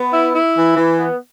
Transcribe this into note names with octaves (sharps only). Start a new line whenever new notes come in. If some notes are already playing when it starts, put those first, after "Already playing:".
Already playing: B3
E4
E4
E3
E3
B3